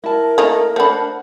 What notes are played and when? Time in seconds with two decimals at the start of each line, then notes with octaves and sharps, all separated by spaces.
0.04 E4 A#4 A5
0.38 A3 A#3 D#4
0.76 A3 D4 C5 F#5 B5